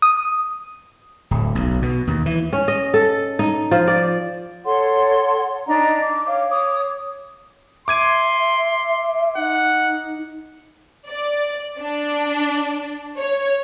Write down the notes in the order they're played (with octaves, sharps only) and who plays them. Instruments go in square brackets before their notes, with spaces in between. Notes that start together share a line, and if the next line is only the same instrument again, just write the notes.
[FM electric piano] D#6
[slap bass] D1
B1
B2
D#2
E3
[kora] C#4
D#5
A4
D#4
F3
D5
[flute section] A4 C#5 F#5 C6
D4 D#4 D#5 A#5
D6
C#5 F5 D6
C#5 D6 D#6
[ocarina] E5 [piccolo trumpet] C6 [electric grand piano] D6 G#6 D#7
[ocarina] D#4 [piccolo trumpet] F#5
[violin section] D5
D4
C#5